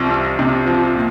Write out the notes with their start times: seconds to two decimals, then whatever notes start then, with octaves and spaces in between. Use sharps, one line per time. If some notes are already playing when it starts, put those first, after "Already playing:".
Already playing: C2 C3 F3
0.10 C2
0.39 C3
0.67 F3
0.95 A#2